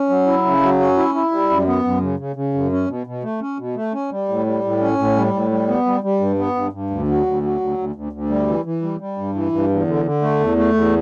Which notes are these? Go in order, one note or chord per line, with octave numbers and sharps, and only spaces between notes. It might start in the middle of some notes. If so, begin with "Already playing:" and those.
Already playing: C#4
F#3
E4
C#3
F#3
C#4
E4
E4
G3
F#2
B3
F#2
C#3
C#3
C#3
F#2
C#4
B2
B2
A3
C#4
B2
A3
C#4
G3
A2
G3
A2
C#4
A2
G3
A2
G3
B3
G3
G3
G2
B3
G2
G2
D2
F#3
D2
F#3
D2
D2
D2
D2
G3
E3
E3
G3
G3
G2
E3
G2
E2
D3
D3
A3
E2
A3
E2